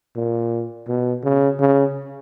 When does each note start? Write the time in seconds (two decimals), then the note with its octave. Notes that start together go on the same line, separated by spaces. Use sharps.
0.15 A#2
0.88 B2
1.24 C#3
1.60 C#3